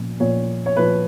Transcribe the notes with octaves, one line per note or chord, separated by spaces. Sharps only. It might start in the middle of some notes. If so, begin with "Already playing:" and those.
Already playing: A#2 F3
A#2 F3 C#5
C#5
A#2 F3 B4